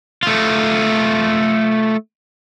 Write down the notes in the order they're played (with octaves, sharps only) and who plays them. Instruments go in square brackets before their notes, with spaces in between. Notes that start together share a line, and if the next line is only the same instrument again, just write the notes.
[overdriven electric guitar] A3 F4